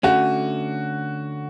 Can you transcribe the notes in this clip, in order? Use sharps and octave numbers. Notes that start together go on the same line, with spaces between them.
D3 A3 C#4 F#4